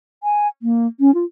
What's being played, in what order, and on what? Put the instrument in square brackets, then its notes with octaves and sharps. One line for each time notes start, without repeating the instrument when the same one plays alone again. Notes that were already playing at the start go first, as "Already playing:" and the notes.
[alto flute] G#5
A#3
C#4
F4